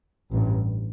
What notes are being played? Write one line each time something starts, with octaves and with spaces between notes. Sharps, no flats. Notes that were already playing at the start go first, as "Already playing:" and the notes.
A1 G2